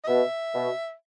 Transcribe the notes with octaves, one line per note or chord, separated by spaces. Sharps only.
D#5
B2 E5
B2